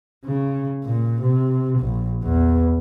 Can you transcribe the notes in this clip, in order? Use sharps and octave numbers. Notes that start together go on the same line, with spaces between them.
C#3
A#2
C3
A#1
E2